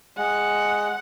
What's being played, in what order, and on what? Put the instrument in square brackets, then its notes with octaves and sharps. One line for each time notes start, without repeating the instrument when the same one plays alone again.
[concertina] G#3 [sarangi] F#5